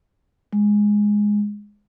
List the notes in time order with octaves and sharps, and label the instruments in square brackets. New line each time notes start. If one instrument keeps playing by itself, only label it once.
[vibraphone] G#3